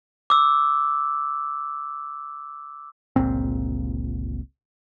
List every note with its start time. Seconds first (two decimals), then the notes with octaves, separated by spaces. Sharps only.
0.30 D6 E6
3.16 G1 C#2 A#2 C4